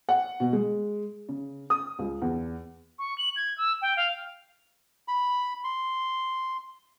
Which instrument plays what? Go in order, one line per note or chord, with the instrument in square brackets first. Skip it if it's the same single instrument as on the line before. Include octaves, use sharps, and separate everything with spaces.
[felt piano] F#5
B2
G#3
C#3
D#6
C#2
E2
[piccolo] C#6
F#7
G#6
E6
G5
F5
[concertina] B5
C6